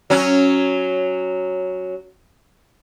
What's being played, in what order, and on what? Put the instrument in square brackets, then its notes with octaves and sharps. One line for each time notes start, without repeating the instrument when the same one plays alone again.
[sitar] F#3 C#4